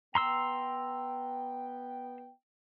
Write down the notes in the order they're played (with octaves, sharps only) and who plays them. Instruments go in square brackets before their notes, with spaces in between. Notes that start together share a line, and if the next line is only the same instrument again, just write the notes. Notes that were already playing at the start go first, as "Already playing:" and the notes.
[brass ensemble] B3 G5 [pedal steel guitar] A#5 C6 E6